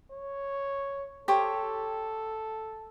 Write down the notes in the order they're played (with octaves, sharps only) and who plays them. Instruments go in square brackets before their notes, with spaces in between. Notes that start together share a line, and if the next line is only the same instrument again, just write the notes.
[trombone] C#5
[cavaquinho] G4 C5 C#5 [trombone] A4